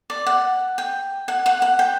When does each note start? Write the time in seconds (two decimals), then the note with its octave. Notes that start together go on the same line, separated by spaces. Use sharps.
0.10 D5
0.26 F#5
0.78 G5
1.28 F#5
1.46 F#5
1.62 F#5
1.79 G5